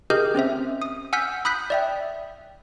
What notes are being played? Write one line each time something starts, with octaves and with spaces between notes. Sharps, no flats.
G4 G#4 A#4 D#5 F6 G6
C4 C#4 C5 E5
D#6
F#5 G#5 E6 F6 G6 B6
B5 D#6 F#6 G6 B6
D5 E5 G5